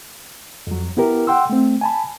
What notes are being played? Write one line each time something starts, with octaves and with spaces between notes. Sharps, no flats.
F2 F#3
B3 E4 G4 A#4
F#5 G5 C6 E6
A3 C4
G#5 A5 B5